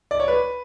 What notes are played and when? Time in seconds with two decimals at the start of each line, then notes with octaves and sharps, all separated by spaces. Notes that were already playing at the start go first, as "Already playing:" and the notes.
0.11 D5
0.20 C#5
0.28 B4